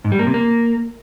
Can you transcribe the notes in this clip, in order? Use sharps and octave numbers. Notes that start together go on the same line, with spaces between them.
G#2
G3
A#3
C3
A#3